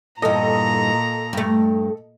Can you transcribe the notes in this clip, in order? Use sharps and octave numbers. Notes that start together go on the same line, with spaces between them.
E2 G2 A#2 A4 D#5 A#5
G2 A3